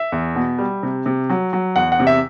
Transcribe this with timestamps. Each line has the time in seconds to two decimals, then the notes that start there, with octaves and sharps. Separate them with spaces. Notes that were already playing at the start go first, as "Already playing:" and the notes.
Already playing: E5
0.12 E2
0.35 B2
0.58 G3
0.83 C3
1.06 C3
1.30 F#3
1.53 F#3
1.76 E2 F#5
1.92 F#5
1.99 C3
2.07 E5